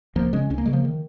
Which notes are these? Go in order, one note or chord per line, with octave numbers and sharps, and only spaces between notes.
C#2 F3 A#3
C#3 G#3 C#4
C#2 C#4
A#3
C#3 G#3
F3 A#3
D#3